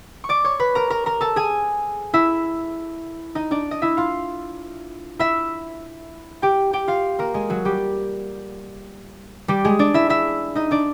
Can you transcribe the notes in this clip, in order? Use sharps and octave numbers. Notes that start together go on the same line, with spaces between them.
C#6
D5 D6
C#5 C#6
B4 B5
A#4 A#5
A#4 A#5
A#4 A#5
A4 A5
G#4 G#5
E4 E5
D#4 D#5
D4 D5
D#5
E4 E5
F4 F5
E4 E5
G4 G5
G4 G5
F4 F5
A#3 A#4
G#3 G#4
F#3 F#4
G3 G4
G3 G4
G#3 G#4
D4 D5
E4 E5
E4 E5
D#4 D#5
D4 D5